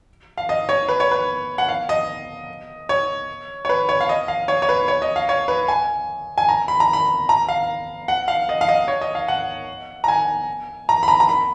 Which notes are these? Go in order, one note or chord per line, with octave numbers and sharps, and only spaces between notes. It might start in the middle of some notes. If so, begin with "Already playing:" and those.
F5
D#5
C#5
B4
C#5
B4
F#5
F5
D#5
C#5
C#5
B4
C#5
F5
D#5
F5
C#5
C#5
B4
C#5
D#5
F5
C#5
B4
G#5
G#5
A#5
B5
A#5
B5
A#5
F5
F#5
F5
D#5
F5
D#5
C#5
D#5
F5
F#5
A#5
G#5
A#5
B5
A#5
A#5
B5